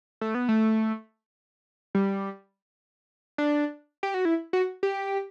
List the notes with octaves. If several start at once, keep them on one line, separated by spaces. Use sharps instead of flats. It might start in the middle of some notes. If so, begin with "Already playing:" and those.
A3
B3
A3
G3
D4
G4
F#4
E4
F#4
G4